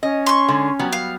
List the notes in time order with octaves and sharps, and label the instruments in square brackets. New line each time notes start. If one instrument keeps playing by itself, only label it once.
[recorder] C#4 [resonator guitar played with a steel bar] D#5
[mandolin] C6 C#6
[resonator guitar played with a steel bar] D3 G#3
F#3 G3 B3
[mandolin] F5